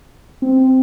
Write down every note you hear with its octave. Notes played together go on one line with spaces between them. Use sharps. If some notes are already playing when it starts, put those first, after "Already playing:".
C4